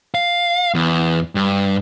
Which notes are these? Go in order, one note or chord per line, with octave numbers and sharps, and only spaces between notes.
F5
E2
G2